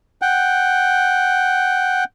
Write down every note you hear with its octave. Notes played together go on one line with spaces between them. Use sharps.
F#5 G5